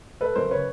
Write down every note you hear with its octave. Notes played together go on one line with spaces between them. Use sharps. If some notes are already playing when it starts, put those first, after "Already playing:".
A3 A4 B4
F#2 A#4 C5
C#3 B4 C#5